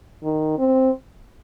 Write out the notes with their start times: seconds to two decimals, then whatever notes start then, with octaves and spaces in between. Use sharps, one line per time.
0.23 D#3
0.58 C4